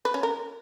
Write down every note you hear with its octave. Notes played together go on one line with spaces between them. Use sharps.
B4
C#4
A#4